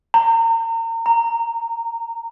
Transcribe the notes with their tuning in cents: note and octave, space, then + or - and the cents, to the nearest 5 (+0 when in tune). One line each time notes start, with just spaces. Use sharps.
A#5 -35
A#5 -10